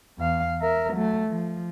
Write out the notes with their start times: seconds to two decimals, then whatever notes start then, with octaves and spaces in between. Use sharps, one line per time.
0.18 E2 F5
0.60 A#4 E5
0.94 F#3 A3
1.28 F3